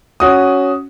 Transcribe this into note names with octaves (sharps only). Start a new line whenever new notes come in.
C#4 F#4 D#6